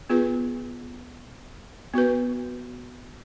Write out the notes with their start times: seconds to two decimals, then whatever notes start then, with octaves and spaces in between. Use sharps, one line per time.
0.10 B3 F4 G#4 B4
1.94 B3 F#4 B4